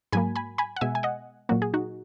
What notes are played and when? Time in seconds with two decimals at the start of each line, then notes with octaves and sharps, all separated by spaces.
0.12 G#2 F#3 A#3 G#5 B5
0.36 G#5 B5
0.58 G#5 B5
0.76 F#5
0.81 B2 G#3 E5 G#5
0.95 G#5
1.03 D#5 F#5
1.49 A#2 F#3 A#3 F#4
1.62 G#4
1.74 D#4 F#4